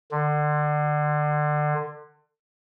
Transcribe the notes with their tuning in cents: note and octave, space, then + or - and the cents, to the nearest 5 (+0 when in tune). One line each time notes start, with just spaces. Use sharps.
D3 +30